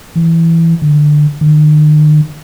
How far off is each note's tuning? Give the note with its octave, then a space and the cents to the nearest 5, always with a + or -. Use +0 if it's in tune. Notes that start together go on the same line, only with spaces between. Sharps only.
E3 +5
D3 +15
D#3 -45